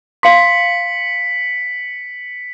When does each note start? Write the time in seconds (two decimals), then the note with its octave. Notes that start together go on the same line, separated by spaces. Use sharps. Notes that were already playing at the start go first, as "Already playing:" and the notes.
0.23 F5 C6 B6 C#7 F#7